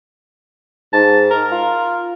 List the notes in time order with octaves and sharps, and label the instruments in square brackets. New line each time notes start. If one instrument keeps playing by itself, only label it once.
[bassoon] G#2 [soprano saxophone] A5
[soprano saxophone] A#4
[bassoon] F4